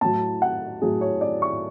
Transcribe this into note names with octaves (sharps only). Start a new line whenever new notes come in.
A2 F#3 A5
F#5
A2 F#3 G#4
C#5
D5
C#6